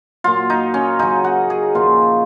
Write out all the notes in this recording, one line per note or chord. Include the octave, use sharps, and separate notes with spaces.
A#2 F#3 F4
D#4
C#4
C#3 F#3 D#4
F#4
G#4
A#2 F3 F4